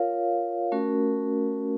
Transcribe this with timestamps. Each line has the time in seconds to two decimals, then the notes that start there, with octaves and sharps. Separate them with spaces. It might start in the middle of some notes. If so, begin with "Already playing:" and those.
Already playing: F4 A#4 C#5 F5
0.72 A3 C#4 F#4 A#4